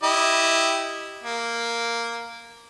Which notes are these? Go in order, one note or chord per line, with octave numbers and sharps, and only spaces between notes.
E4 G4 D#5
A#3